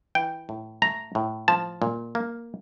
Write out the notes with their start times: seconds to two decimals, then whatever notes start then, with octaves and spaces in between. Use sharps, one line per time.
0.15 E3 G5
0.49 A2
0.82 A3 A#5
1.15 A2
1.48 F3 A5
1.82 A#2
2.15 A#3